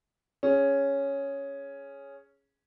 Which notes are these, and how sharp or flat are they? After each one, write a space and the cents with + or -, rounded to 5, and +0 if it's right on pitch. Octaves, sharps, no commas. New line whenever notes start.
C#4 +0 G#4 +0